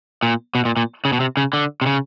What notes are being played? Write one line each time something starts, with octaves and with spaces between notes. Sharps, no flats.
A#2
B2
A#2
A#2
C#3
B2
C3
C#3
D3
C3
C#3